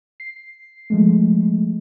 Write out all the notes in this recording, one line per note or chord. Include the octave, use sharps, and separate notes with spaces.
C7
F3 G#3 A3